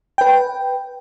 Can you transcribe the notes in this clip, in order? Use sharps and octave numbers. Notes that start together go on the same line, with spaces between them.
B4 G5